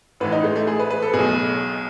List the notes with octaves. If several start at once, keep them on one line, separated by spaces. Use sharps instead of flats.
A1 A2 E3 B4
D#4
G#3
A3
G#4
B4
B4
A4
B2 G#4
B1